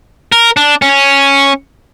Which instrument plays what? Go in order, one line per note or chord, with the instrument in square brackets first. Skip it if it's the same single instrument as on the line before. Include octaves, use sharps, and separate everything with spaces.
[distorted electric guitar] A#4
D4
C#4